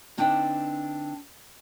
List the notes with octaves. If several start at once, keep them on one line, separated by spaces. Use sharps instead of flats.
D3 C4 D4 D#4 B4 G5